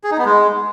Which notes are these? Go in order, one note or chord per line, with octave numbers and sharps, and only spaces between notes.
G#4
D#4
B3
G#3